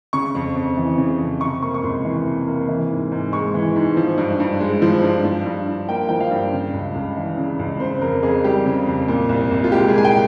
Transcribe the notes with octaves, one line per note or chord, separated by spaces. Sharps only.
C#3 C#6
F2
F2
E3
C#3
F2
C3 C#6
A#3 C#6
C#6
C#2 C6
E3
C3
A#3
E3
G#2
G#2
G#3 C#6
E3
G#2
F3
G2
G2
G#3
F3
G2
F3
G2
G2
A#3 G5
F3 G5
F5
G2
C#3
C#2
C#2
E3
C#3
C#2
C#3 C5
F2 A#4
F2 G#4
G3 G4
C#3
F2
A#2
C2
C2
F4
G#3 G4
G#4
A#2 G#5
G5